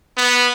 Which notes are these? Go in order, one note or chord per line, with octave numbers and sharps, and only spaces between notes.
B3